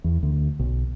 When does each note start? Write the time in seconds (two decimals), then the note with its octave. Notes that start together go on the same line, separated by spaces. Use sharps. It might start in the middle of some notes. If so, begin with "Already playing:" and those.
0.04 E2
0.23 D2
0.59 B1